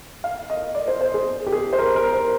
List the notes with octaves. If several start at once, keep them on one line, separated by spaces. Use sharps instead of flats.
F5
D#5
D5
C5
C5
G#4
G4
G#4
C5
A#4
A#4
C5